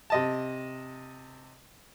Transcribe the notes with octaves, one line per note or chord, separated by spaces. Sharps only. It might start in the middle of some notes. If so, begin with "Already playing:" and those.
C3 D#5 A5